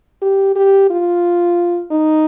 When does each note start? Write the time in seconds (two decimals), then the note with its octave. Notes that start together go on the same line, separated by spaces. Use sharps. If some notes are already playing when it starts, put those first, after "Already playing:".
0.21 G4
0.56 G4
0.90 F4
1.91 D#4